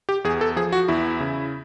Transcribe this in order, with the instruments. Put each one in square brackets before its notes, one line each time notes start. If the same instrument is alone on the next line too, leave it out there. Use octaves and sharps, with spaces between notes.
[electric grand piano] G4
E2 G#4
A4
F3 G#4
F#4
E2 E4
C#3